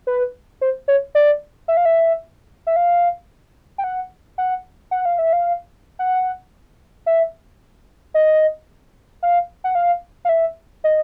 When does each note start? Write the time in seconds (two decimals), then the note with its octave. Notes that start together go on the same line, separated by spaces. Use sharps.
0.07 B4
0.61 C5
0.88 C#5
1.15 D5
1.68 E5
1.77 F5
1.85 E5
2.67 E5
2.76 F5
3.78 G5
3.84 F#5
4.38 F#5
4.91 F#5
5.05 F5
5.19 E5
5.33 F5
5.99 F#5
7.06 E5
8.14 D#5
9.23 F5
9.64 F#5
9.75 F5
10.25 F5
10.29 E5
10.84 D#5